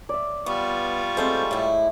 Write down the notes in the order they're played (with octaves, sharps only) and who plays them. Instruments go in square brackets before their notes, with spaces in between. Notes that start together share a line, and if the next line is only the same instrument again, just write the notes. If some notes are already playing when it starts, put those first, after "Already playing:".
[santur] D5 E5
[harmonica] G3 F4 C#6 [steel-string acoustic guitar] B3
[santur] G#3 A3 [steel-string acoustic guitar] C4 A4 C5
[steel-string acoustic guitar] A2 E4